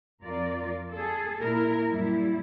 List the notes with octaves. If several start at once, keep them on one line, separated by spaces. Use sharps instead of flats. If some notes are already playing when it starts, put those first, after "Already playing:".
F2 F4 A#4 D5
G#4 A4
A#2 E4 A#4
F#2 A#2 G3 E4